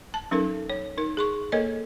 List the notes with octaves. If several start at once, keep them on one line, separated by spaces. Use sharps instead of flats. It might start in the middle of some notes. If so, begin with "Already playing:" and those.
A5
F#3 C#4 D#4 A4 A#4
C#5
D#4 A#4
G#4 C6 C#6
A#3 A4 A#4 C#5 D#5